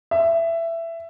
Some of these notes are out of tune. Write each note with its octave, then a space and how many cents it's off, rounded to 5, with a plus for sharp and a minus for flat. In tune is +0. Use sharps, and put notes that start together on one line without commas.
E5 +15